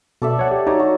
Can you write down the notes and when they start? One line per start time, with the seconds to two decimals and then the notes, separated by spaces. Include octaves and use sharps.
0.22 B2 A4 D5 E5
0.39 C#5 F#5
0.51 G4
0.67 F#3 D#4 C#5
0.79 F#4